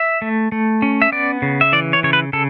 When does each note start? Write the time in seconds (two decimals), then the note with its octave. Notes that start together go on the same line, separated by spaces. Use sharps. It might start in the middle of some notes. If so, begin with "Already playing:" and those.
Already playing: E5
0.22 A3
0.52 A3
0.82 C#4
1.02 E5
1.12 B3 D5
1.42 C#3
1.61 E5
1.72 E3 D5
1.93 C#5
2.03 C#3 C#5
2.13 B4
2.33 C#3 A4